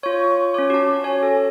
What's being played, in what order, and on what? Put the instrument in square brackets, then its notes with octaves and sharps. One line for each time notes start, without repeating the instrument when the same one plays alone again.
[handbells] F4 C#5 [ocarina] C#6
[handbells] C#4 C#5 [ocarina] D6
[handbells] F#4 A5
[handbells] C#5 [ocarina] G#5
[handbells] A4